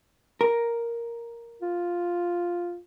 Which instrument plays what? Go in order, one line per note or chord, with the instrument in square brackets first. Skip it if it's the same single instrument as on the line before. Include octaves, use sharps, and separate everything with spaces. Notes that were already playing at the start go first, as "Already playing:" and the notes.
[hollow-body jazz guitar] A#4
[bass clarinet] F4